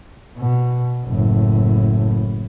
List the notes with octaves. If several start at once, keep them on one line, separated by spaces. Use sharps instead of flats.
B2
F#1 A2